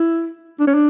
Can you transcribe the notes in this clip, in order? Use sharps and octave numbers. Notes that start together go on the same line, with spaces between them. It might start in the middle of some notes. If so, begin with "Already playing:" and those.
Already playing: E4
D4
C#4
D4